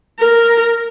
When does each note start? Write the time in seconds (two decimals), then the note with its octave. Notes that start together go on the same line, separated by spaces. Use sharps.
0.20 A#4